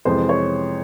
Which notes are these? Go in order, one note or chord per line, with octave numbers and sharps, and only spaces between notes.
F2 C3 E3 G#3 C5
C#5